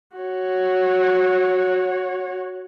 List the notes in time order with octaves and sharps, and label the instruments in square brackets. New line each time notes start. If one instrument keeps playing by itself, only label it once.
[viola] F#4 C#5